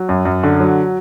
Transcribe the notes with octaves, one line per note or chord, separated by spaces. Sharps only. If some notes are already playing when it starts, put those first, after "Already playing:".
Already playing: F#3
F#2
F#2
D3
F#3